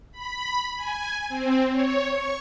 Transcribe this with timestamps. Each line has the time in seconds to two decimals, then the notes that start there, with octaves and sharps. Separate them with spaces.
0.12 B5
0.76 G#5
1.29 C4
1.71 C#5
2.06 C#6